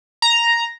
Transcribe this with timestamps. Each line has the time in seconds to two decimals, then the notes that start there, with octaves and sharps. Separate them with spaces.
0.22 A#5